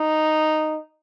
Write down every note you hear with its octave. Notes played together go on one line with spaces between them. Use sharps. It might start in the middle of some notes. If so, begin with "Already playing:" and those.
Already playing: D#4